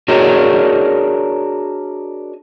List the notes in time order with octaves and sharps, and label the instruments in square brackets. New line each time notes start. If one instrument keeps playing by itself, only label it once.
[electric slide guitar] D4 F#4 G#4 A#4 C#5 D#5